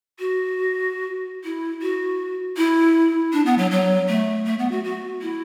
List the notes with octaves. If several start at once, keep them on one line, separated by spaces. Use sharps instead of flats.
F#4
E4
F#4
E4
D4
B3
F#3
F#3
A3
A3
B3
F#4
F#4
E4